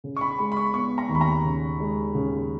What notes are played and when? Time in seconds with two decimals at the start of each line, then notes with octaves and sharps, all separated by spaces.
0.04 C#3
0.17 C#6
0.21 B5
0.39 G#3 B5
0.52 B5
0.57 C#6
0.74 B3 C#6
0.98 A#5
1.09 D#2
1.15 B5
1.21 A#5
1.44 C#3
1.80 G#3
2.15 C#3